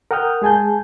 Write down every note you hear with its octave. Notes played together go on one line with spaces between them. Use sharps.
A#4 F#5 G5 D#6 F6 G6
G#3 G#4 G#5 A5 G6